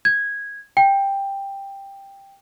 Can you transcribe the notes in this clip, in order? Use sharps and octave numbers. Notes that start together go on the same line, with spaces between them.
G#6
G5